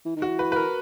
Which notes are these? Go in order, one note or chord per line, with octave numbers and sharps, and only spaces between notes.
E3
D#3
E3 F#4
B4
B4
A#4